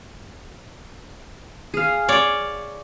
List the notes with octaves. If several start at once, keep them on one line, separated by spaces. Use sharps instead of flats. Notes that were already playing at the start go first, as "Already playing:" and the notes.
G#4 F5
C#5 D5